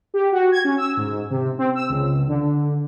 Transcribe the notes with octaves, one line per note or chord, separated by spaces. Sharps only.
G4
F#4
G#6
C#4
E6
G#2
C3
C4
E6
C#2
D3